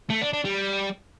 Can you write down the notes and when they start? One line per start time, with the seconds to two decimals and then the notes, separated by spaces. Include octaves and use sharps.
0.10 A3
0.21 D4
0.33 D4
0.45 G3